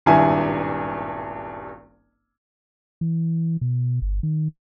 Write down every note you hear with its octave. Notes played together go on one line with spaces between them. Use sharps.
D#1 G#1 G2 E4 G#5
E3
B2
G1
D#3